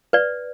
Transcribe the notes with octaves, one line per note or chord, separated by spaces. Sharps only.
B4 D5